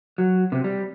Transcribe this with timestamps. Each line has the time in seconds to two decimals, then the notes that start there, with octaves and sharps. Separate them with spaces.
0.18 F#3
0.52 C3
0.64 G3